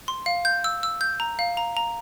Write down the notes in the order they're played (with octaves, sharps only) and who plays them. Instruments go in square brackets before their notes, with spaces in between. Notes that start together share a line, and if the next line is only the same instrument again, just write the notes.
[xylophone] C6
F5
G6
E6
E6
G6
A#5
F5
A#5
A#5